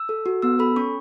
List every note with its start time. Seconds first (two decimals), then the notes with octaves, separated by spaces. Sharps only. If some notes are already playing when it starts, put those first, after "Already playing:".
Already playing: E6
0.09 A4
0.26 F#4
0.42 B3 E6
0.59 A4 B5
0.76 C#4 C#6